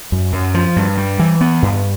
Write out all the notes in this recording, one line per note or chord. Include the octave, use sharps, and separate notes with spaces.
F#2
F#2
F3
G2
G3
E3
B3
G2